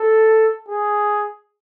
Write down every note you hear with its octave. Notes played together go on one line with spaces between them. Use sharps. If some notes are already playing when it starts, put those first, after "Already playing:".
Already playing: A4
G#4